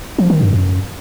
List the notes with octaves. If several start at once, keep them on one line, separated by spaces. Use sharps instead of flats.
F3
D#3
G2
F#2